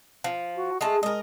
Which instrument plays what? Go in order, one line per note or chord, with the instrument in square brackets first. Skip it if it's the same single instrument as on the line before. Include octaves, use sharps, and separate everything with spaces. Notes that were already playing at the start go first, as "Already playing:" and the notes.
[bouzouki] F3
[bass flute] F#4
[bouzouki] G#3 A3 A5 [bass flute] G#4
[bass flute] G#3 [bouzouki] A#4 D#5